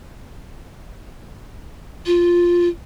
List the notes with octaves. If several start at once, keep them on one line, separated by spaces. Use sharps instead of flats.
F4